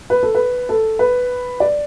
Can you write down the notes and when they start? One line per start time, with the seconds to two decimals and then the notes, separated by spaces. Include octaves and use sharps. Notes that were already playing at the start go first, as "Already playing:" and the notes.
0.10 B4
0.23 A4
0.35 B4
0.69 A4
0.99 B4
1.60 D5